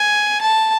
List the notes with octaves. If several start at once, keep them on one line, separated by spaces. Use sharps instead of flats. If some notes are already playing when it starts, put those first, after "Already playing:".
Already playing: G#5
A5